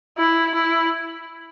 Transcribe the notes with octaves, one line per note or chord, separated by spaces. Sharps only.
E4
E4